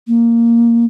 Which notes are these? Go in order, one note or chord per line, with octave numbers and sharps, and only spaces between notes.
A#3